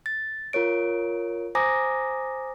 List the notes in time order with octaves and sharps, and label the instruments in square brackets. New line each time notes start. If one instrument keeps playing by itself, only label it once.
[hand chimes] A6
F4 A#4 C#5 D7
C5 G#5 A#5 D6 D#6 A#6